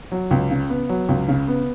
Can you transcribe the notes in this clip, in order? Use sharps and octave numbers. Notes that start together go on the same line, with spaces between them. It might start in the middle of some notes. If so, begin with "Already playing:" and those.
F#3
C#2
C#3
B3
F#3
C#2
C#3
B3